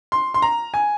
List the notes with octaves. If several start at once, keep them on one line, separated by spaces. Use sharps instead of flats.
C6
C6
A#5
G#5